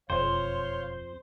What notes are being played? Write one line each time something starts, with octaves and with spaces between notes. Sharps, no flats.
E1 F2 C5 C#5 F5